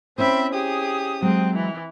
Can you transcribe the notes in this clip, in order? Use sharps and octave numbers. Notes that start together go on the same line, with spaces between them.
C4 C#4 E4 C5 E5 B5
G4 G#4 D#6
F#3 G#3 C4
E3